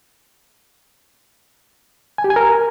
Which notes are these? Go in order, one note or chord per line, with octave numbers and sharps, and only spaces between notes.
G#5
G4
G#5
A#4